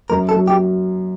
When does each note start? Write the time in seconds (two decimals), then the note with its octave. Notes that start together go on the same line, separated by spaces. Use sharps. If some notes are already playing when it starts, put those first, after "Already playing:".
0.10 F#2 A#4
0.29 A4
0.34 F#3
0.48 G4